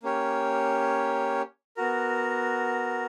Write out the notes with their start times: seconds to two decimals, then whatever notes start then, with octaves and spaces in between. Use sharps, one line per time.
0.03 A#3 C#4 G4 C#5
1.77 B3 F#4 A#4